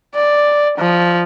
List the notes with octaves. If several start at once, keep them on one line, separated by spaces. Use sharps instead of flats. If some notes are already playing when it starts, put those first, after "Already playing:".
D5
F3